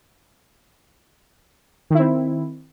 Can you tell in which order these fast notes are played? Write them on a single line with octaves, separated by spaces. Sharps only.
D#3 E4 C4